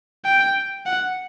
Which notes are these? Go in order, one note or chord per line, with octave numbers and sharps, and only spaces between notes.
G5
F#5